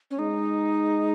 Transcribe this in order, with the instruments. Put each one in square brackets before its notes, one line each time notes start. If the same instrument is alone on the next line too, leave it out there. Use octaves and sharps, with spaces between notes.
[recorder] C#4
[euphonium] G#3 [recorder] D#4